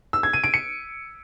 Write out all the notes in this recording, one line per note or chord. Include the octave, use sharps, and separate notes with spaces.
E6
G#6
D#7
D7
C#7